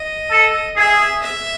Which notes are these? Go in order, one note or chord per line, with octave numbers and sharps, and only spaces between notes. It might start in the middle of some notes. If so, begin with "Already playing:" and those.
Already playing: D#5
A4
G#4 E5
E5